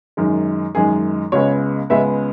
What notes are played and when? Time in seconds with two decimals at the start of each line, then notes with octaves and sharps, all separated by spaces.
0.17 F#2 D#3 G#3
0.75 F#2 D#3 G#3 G#4
1.32 C#2 C#3 G#3 B3 C#5
1.90 C#2 C#3 G#3 B3 E5